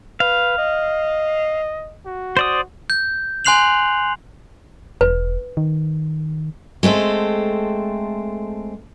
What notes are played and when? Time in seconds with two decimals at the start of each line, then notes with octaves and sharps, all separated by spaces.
0.20 B4 F5
0.58 D#5
2.06 F#4
2.37 C5 D5 D#6
2.90 G6
3.45 G#5 C6 F#6 C7 F7 F#7
5.01 E1 B4
5.57 D#3
6.83 G#3 A3 C4 A4